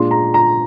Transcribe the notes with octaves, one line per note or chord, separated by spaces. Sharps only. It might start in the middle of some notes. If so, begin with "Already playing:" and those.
Already playing: A#2 G#3 D4 F4 C6
A#5
A#5